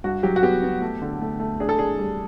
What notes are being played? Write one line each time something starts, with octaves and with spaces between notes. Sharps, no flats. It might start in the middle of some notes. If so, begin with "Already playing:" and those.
G2 F#4
F#3 G4
F#4
B3 G4
B3
A3
D3
A3
A3
D4 G#4
A4
D4 G#4
G3